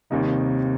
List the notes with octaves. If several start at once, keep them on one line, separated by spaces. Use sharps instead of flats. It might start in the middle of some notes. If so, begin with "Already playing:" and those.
D#2 C3 D#3 G3 A#3 D#4